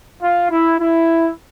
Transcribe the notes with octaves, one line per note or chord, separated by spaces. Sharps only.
F4
E4
E4